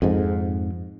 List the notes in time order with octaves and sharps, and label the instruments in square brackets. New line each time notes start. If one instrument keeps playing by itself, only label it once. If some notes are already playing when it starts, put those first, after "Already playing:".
[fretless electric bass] F2 G#2